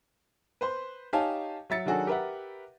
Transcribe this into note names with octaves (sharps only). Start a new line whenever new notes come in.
B4 C5 C6
D#4 G4 C#5 F5 G#5 A5
F#3 E5 A6 C#7
D#3 F#3 D4 F#4 G#4 A4
G4 A#4 B4 E5 F#5